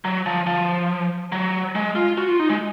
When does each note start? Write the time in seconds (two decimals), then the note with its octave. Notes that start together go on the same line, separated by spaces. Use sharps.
0.05 F#3
0.26 F3
0.47 F3
1.32 F#3
1.75 G#3
1.96 F4
2.18 F#4
2.28 F4
2.39 D#4
2.50 G#3